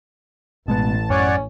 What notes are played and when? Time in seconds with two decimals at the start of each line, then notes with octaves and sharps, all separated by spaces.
0.68 A1 B2 G#3 B3 A5
1.10 F#2 C#4 C#5 D5 F#5